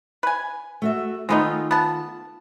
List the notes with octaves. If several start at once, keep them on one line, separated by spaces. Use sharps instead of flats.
B4 G#5
A3 F#4 E5
D#3 G#3 A3 B3 D#4 F4
B3 A5